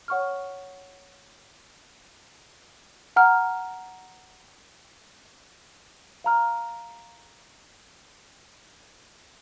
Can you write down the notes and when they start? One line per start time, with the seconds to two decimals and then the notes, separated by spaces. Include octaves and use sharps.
0.08 C#5 F#5 C#6 F6
3.16 F#5 A#5 F6
6.24 F5 A#5 F6